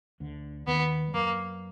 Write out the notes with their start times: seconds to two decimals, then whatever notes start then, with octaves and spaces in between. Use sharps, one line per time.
0.20 D2 D3
0.67 D#2 D#3 B3
1.08 G3
1.14 F#2 F#3 A#3